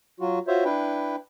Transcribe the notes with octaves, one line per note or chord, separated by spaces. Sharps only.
F#3 F4 F#4
F4 F#4 C5 C#5 E5
D4 E4 B4 G5